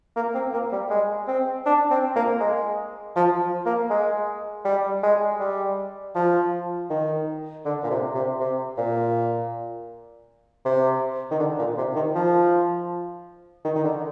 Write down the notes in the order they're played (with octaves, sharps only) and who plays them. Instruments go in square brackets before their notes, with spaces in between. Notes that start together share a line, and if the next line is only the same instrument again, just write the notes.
[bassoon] A#3
C4
A#3
G3
G#3
C4
D4
C4
A#3
G#3
F3
A#3
G#3
G3
G#3
G3
F3
D#3
D3
A#2
C3
C3
C3
A#2
C3
D#3
D3
A#2
C3
D#3
F3
D#3
D#3
D3